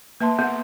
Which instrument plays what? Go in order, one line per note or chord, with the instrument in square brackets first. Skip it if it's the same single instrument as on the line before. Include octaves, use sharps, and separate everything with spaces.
[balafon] A#3 [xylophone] B4 E5 A5 C6
[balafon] B3